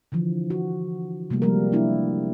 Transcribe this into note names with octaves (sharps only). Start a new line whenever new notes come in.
D3 E3 F3
F#4
C3 G3 A3 A#3
F3 G3 G#3 A#3 A#4
A#3 D4 E4